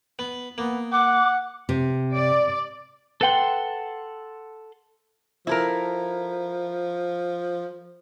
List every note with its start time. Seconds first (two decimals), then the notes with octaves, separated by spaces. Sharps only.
0.19 B3
0.58 A#3 B3
0.92 F#5 D6
1.69 C3
2.12 D5
3.21 A4 B4 F#5 G5 C6
5.47 F3 E4 A4 A#4